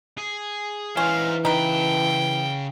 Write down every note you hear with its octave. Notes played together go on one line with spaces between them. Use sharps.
G#4
E3 C#4 D#4 C5 F5
C#3 D#4 B4 G5 A5